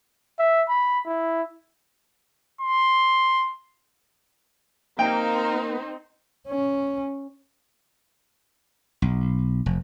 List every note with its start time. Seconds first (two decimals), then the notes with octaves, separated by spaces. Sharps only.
0.39 E5
0.69 B5
1.06 E4
2.61 C6
4.99 A#3 C4 D#4 A#4 G5
6.48 C#4
9.02 B1
9.66 F1